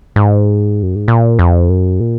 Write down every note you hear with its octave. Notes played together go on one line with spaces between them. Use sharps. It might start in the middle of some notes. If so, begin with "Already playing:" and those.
G#2
F#2
G#2
A#2
F2
F#2
A#2